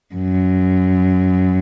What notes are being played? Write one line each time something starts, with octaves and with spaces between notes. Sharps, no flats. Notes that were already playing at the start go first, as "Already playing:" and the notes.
F#2